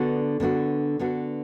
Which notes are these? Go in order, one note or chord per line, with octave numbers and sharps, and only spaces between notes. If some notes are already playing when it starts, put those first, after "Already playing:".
Already playing: D3 B3 D4 F#4
D3 B3 D4 F#4
D3 B3 D4 F#4